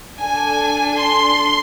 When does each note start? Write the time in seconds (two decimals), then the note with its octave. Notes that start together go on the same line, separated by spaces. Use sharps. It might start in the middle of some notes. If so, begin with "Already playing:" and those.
0.18 D4 A4 G#5
1.00 C6